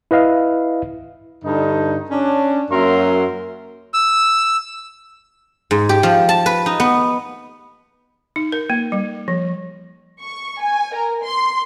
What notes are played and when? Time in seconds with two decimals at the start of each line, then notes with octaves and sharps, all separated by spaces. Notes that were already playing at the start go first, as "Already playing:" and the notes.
0.11 E4 B4 D#5 F5
1.44 G2 D3 D#4
2.10 C#4 D4
2.71 F#2 F#3 A#3 A#4 E5 C6
3.94 E6
5.71 G#2
5.89 G4
6.03 F3
6.29 A5
6.46 B4
6.66 D#4
6.80 B3
8.36 D#4
8.52 A#4
8.70 A#3
8.92 G3
9.28 F3
10.20 C#6
10.61 G#5
10.94 A#4
11.24 C6